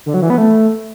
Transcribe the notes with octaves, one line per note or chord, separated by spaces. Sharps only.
D3
F#3
E3
B3
A3